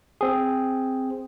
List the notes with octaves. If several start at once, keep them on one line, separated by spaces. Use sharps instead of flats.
C4 G#4